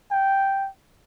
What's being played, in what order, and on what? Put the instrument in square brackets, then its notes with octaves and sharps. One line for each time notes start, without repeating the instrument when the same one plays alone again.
[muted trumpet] G5